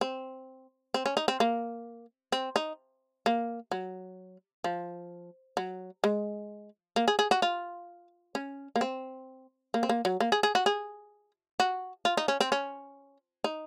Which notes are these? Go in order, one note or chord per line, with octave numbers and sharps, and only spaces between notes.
C4
C4
C#4
D#4
C4
A#3
C4
D#4
A#3
F#3
F3
F#3
G#3
A#3
G#4
G#4
F#4
F4
C#4
A#3
C4
A#3
C4
A#3
F#3
A#3
G#4
G#4
F#4
G#4
F#4
F4
D#4
C#4
C4
C#4
D#4